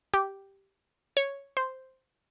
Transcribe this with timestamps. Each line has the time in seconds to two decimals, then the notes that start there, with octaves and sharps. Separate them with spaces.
0.14 G4
1.17 C#5
1.57 C5